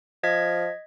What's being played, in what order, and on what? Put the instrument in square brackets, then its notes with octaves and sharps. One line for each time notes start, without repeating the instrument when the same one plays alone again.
[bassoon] F3 [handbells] D#5 G#6 B6